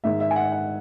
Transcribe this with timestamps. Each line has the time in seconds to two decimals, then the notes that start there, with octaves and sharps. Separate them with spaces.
0.04 G#2 D#3 G#3 E5
0.20 E5
0.31 G#5
0.36 F#5
0.52 F#5